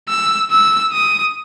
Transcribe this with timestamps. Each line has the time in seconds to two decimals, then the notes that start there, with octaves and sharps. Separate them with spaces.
0.08 E6
0.50 E6
0.92 D#6